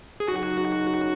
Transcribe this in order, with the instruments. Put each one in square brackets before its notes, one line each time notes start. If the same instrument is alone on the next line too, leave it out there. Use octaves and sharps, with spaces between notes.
[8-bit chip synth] G#4
[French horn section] F#2 C#3 F#3 D#4 [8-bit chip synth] F#4